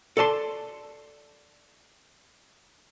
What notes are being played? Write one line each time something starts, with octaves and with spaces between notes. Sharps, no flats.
A4 D5 A5 C6